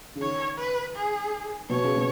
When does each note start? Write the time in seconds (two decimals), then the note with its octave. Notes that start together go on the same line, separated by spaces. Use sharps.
0.15 C#3
0.21 D#3 C#5
0.58 B4
0.96 G#4
1.69 B2 C#5
1.83 C#3
1.96 B2